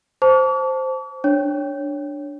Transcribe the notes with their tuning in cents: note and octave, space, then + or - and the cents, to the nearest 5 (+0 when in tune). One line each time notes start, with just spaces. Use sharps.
C5 +0 A5 +0 D6 -45
D4 +0 C#5 +0